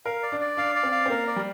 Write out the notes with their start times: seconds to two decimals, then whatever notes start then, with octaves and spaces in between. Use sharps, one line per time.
0.05 A#4 F5
0.22 D5
0.32 D4
0.41 D5
0.57 D4 F5
0.75 D5
0.83 C4
0.92 F5
1.06 C4
1.10 A#3 A#4
1.27 D5
1.36 G3